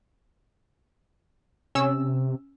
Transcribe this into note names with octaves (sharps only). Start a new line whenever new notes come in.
C3 C#4 E6